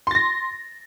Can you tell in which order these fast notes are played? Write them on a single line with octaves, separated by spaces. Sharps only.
C6 A6 A#6